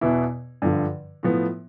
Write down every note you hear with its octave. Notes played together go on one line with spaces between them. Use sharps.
E2 B2 B3 E4
G2 D3 F3
A2 F3 B3